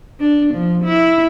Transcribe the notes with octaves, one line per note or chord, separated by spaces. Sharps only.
D4
F3
E4